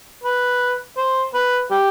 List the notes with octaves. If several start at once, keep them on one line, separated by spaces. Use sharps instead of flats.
B4
C5
B4
G4